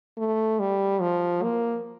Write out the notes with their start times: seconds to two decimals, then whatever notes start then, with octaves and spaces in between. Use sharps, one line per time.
0.18 A3
0.60 G3
1.01 F3
1.43 A#3